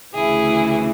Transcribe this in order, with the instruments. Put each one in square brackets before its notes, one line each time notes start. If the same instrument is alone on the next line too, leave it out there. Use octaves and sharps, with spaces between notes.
[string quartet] D2 C#3 E3 E4 G#4